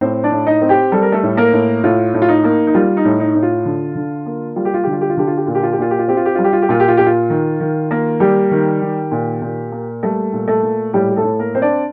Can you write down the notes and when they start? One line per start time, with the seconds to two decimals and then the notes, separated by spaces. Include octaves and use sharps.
0.01 A2 C4 C5
0.24 D4 D5
0.32 A2
0.47 D#4 D#5
0.62 C4
0.69 G4 G5
0.92 G3 A4
1.02 A#4
1.12 A3 A4
1.23 A2
1.37 A#3 A#4
1.53 A2
1.84 A2 F4
2.14 A2
2.22 F4
2.29 D#4
2.44 A#3
2.67 D#4
2.74 G3 F4
2.97 D#4
3.05 A2
3.20 D#4
3.35 A2
3.43 F4
3.66 D3
3.95 D3
4.26 A#3
4.56 G3 F4
4.65 G4
4.74 F4
4.83 D3 G4
4.93 F4
5.01 G4
5.10 F4
5.17 D3 G4
5.27 F4
5.37 G4
5.46 A#2 F4
5.55 G4
5.63 F4
5.72 G4
5.78 A#2 F4
5.91 G4
5.99 F4
6.08 C4 G4
6.17 F4
6.25 G4
6.35 G3 F4
6.44 G4
6.53 F4
6.62 G4
6.69 A#2 F4
6.80 G4
6.88 F4
6.97 A#2 G4
7.07 F4
7.30 D#3
7.60 D#3
7.91 A#3
8.20 G3 G4
8.51 D#3
8.82 D#3
9.12 A#2
9.42 A#2
9.72 A#3
10.03 G3 A3 A4
10.33 A#2
10.48 A3 A4
10.63 A#2
10.93 A2 G3 G4
11.10 G4
11.16 A3 A4
11.24 A2
11.39 A#3 A#4
11.55 C4 C5
11.62 D4 D5